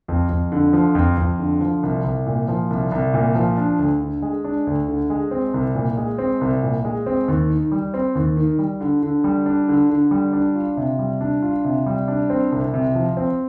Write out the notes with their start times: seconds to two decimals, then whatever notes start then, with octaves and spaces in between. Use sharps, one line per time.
0.08 F2
0.30 F2
0.52 D3
0.73 F3
0.95 F2
1.17 F2
1.39 D3
1.61 F3
1.83 C2
2.04 C2
2.26 A#2
2.48 F3
2.70 C2
2.92 C2
3.14 A#2
3.35 F3
3.57 D4
3.79 D2
4.01 D3
4.22 G#3
4.44 D4
4.67 D2
4.88 D3
5.10 G#3
5.31 C4
5.54 C2
5.75 A#2
5.97 G#3
6.18 C4
6.41 C2
6.63 A#2
6.85 G#3
7.06 C4
7.28 D#2
7.50 D#3
7.72 G3
7.94 C4
8.15 D#2
8.37 D#3
8.59 G3
8.80 D3
9.03 D3
9.24 G3
9.46 D4
9.68 D3
9.89 D3
10.11 G3
10.33 D4
10.55 F4
10.77 C3
10.99 G3
11.21 D4
11.42 F4
11.65 C3
11.86 G3
12.08 D4
12.30 C4
12.52 C2
12.74 C3
12.95 F3
13.17 C4